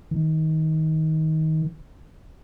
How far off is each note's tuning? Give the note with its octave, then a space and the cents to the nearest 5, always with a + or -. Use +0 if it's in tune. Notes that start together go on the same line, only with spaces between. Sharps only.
D#3 +20